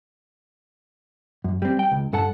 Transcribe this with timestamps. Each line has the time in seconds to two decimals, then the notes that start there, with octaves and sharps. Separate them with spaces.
1.44 F#2
1.62 G3 C4
1.79 G5
1.91 C#2
2.13 G2 A4 F#5 A5